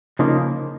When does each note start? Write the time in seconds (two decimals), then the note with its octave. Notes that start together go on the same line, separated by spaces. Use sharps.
0.19 C#3 F3 A#3 D#4